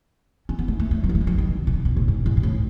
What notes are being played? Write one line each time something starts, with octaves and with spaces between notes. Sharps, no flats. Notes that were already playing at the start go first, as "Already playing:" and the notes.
C#4
B3
A3
A3
A3
F#3
B3
A3
G#3
F#3
D#3
B2
C#3
B2
A2
G#2
E2
G#2
A2